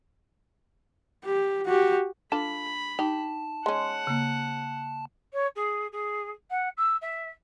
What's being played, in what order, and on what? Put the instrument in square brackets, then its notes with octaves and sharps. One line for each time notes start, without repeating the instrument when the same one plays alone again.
[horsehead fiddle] G4
F#4 G4
[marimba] D4 [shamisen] F4 A4 [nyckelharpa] B5
[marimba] D#4 [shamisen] G4 [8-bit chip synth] A5
[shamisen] G#3 C#4 [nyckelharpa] F#5
[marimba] C#3 A#3
[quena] C#5
G#4
G#4
F#5
E6
E5